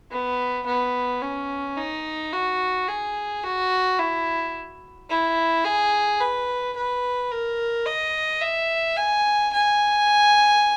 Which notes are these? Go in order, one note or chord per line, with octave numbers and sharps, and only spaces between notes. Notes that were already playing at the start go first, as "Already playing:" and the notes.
B3
B3
C#4
D#4
F#4
G#4
F#4
E4
E4
G#4
B4
B4
A#4
D#5
E5
G#5
G#5